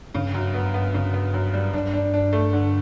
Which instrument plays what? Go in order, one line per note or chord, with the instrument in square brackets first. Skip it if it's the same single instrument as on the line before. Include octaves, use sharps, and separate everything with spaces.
[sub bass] G2 [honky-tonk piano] C#3
[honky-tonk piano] F#2
B3
B3
C#3
B3
F#2
G3
[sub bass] G2 [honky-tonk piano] D4
[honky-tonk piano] D4
D4
A3
D3